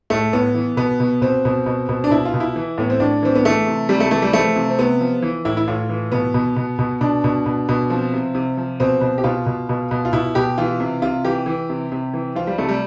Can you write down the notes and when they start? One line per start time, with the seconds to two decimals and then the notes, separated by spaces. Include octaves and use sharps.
0.10 A2 A3
0.33 A2 B3
0.55 E3
0.77 B2 B3
1.00 B2
1.21 B2 C4
1.45 B2
1.66 B2
1.89 B2
2.04 D4
2.11 B2 E4
2.25 F4
2.34 B2
2.40 E4
2.56 E3
2.78 A2 B3
2.90 C4
3.00 A2 D4
3.22 E3 C4
3.35 B3
3.45 E3 A3
3.67 C3
3.89 C3 G3
4.00 A3
4.11 E3 A3
4.22 G3
4.33 F3 A3
4.56 C3
4.70 C4
4.79 C3 B3
5.01 F3
5.22 E3
5.45 A2 E4
5.57 E4
5.68 A2 F4
5.89 E3
6.12 B2 B3
6.34 B2
6.56 B2
6.79 B2
7.01 B2 D4
7.24 B2
7.46 B2
7.69 B2
7.90 F3 C4
8.13 C3
8.35 C3
8.57 F3
8.80 B2 C4
9.01 B2
9.18 G4
9.24 B2 F4
9.46 B2
9.69 B2
9.91 B2
10.05 F4
10.13 B2 E4
10.35 B2 G4
10.58 E3 F4
10.80 C3
11.02 C3 F4
11.25 E3 G4
11.46 E3
11.69 C3
11.92 C3
12.14 E3
12.35 F3 F4
12.47 G3
12.58 C3 A3
12.69 G3